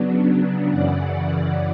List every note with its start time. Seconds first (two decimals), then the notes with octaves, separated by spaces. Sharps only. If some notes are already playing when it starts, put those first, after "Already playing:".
Already playing: C#3 F#3 B3 D4
0.68 F#2 C#3 E3 D5 F#5